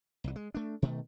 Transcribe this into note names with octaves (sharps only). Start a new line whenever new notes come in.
C2 E3
G#3
A3 D4
B2 D#3 A3